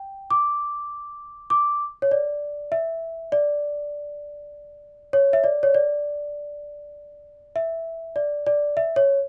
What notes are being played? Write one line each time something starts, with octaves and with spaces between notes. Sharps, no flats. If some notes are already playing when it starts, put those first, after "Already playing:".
Already playing: G5
D6
D6
C#5
D5
E5
D5
C#5
E5
D5
C#5
D5
E5
D5
D5
E5
C#5